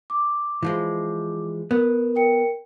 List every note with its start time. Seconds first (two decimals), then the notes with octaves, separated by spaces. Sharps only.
0.10 D6
0.63 E3 F3 G#3
1.71 B3 A#4
2.15 A#4 G5 C#7